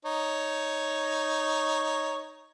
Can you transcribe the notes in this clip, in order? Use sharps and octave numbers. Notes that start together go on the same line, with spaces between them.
D#4 C#5